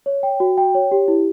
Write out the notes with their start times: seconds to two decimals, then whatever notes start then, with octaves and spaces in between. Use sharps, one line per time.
0.06 C#5
0.23 G5
0.40 F#4
0.58 G5
0.75 C#5
0.92 G4
1.08 E4